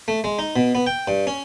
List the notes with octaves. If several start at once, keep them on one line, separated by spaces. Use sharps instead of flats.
A3
G#3
D#4
B2
B3
G5
G2
C#4